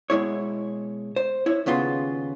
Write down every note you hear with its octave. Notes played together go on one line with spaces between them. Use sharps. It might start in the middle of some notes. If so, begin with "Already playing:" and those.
B2 G#3 E4 C#5
C5
E4 C#5
D#2 C#3 B3 F4 C6